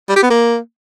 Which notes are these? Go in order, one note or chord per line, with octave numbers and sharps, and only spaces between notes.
G3
G4
B3
A#3